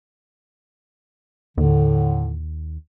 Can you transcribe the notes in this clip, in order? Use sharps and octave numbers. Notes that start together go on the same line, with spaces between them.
D#2 A2 D3